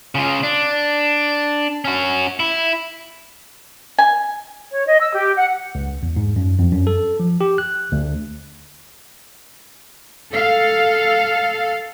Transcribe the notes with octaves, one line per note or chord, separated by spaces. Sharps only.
C#3 F4
D4
C#4 F#4
E4
G#5
C#5
D#5
E6
G4
F#5
C#2
E2
G#2
F#2
F2
F#2
A4
F3
G4
F#6
D2
A4 F5